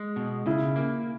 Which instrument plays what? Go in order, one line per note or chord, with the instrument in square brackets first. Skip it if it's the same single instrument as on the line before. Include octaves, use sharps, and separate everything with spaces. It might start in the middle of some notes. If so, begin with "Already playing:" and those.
Already playing: [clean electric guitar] G#3
B2
[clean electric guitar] C#3 [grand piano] E4
[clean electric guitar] A#3